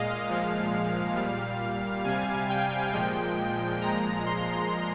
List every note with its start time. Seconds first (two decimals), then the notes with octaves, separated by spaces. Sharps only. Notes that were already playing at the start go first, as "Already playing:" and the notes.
Already playing: A#2 G#3 D#5 F5
0.28 A#2 F3 G#3
1.16 A#2 G3
2.04 C3 G3 G#5
2.49 G5
2.93 A#2 F3 G#3 G5
3.81 A#2 F3 G#3 A#5
4.26 C6